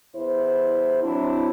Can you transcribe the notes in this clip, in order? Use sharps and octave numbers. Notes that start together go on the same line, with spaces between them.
E2 E4 C5
F#3 C4 D4 E4